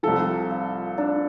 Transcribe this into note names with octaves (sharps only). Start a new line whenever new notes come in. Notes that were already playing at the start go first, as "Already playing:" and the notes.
C2 C3 F3 A4
F4
D4